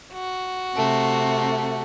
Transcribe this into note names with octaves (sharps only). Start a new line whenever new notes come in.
F#4
C3 A3